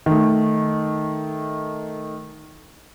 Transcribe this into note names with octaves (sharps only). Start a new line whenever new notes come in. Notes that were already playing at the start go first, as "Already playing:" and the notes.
D#3 A3